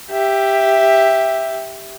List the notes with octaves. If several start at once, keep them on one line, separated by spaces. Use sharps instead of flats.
G4 E5